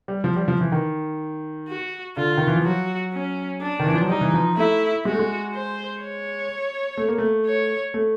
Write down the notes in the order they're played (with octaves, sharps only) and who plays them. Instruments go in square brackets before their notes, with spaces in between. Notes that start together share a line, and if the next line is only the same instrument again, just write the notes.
[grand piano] G3
F3
G3
F3
E3
D#3
[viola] F#4
[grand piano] D3 [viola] F4
[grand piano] D#3
E3
F3
[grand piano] F#3 [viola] F#4
[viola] C#4
D4
[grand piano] D#3
E3
F3
F#3
[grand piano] G3 [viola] D#4
[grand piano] E3
F3
[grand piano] A3 [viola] E4
[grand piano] G#3 [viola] F#4
[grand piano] A3
G#3
[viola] C5
C#5
[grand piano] A3
A#3
A3
[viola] C#5
[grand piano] A3